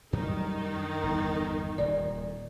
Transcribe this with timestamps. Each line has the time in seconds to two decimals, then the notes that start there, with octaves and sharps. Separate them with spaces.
0.13 F#2 D#3 F#3 G3 D#4
1.03 G1 E2
1.78 D#1 A#2 D5